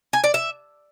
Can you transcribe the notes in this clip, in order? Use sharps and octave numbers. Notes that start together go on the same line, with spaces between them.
G#5
D5
E5